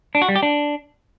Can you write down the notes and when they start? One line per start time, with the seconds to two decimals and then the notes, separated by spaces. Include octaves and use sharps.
0.15 D4
0.22 F#4
0.29 G3
0.36 G4
0.43 D4